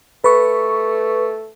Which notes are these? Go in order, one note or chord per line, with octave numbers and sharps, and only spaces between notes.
A3 B4 C#6